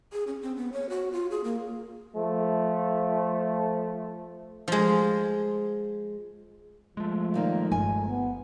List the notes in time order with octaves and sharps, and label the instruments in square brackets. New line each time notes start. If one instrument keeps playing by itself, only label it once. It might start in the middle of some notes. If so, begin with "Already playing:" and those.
[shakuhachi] G#4
C#4
C4
B3
C#5
F#4
F4
G#4
A#3
[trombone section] F3 A3
[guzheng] F3 G#3
[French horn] F3 [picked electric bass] G#3 A3
[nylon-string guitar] A#2 D#3 A#3
[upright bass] G1 [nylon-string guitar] G#5
[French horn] B3